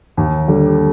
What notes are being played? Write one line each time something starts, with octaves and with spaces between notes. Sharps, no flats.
D#2
D3 G3